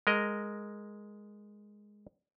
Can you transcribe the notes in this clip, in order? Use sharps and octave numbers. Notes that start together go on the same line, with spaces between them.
G#3 A#4 D#5